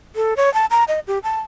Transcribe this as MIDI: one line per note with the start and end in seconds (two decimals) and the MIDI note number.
0.16 0.34 69
0.37 0.52 73
0.54 0.66 81
0.71 0.84 82
0.88 1.00 75
1.07 1.19 67
1.23 1.40 81